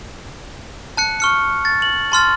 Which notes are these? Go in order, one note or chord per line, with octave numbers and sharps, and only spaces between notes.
A5 F#6 C#7
C#6 F6 C#7
A6
F#7
A5 C6 F6 A6